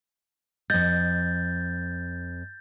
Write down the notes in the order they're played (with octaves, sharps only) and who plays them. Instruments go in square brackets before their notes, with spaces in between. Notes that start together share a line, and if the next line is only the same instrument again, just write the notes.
[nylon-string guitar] F2 D#5 [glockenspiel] G6 A6